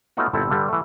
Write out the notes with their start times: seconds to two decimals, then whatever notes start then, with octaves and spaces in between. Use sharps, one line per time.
0.17 A3 B3 C#4 D#4 F4 F#4
0.33 G1 A#2 C4 E4 A4
0.51 G2 D3 G3
0.69 E3 A3